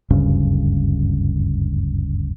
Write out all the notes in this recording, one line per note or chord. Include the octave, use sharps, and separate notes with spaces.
F#1 D2 G2 C#3